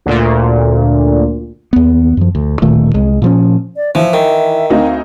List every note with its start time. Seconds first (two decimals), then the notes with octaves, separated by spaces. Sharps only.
0.06 D2 A#2
1.73 D#2 B3
2.17 F#2 F3
2.35 D2
2.62 D1 A#2 D#3 A3
2.94 C2 G#3
3.22 A#2 F3 C#4
3.76 D5
3.95 E3 F3 E5
4.13 D#3
4.70 D2 C4 D#4 F5